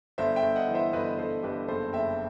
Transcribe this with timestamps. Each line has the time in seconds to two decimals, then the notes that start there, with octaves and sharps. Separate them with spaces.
0.18 G1 C5 E5
0.36 E5 G5
0.42 G1
0.56 D#5 F#5
0.68 E3
0.74 C5 E5
0.93 G1 B4 D#5
1.18 G1 A4 C5
1.43 G1 G4 B4
1.68 F#1 A4 C5
1.93 F#1 E5 G5